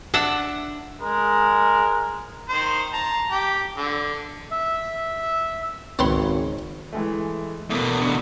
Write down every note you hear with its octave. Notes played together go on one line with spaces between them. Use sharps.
D4 E5 F#5
G#3 A#4
D#3 C5
A5 A#5
G4
D3
E5
G#1 C#2 D#3 C4 B4 C#5 C6
E3 G#3 A3
E2 B2 A3 A#3
A1 D3 C#7